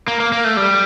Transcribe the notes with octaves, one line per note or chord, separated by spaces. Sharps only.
A#3
A#3
A#3
A3
G3